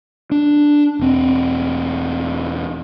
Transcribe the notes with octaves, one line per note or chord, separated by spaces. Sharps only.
D4
E1 C4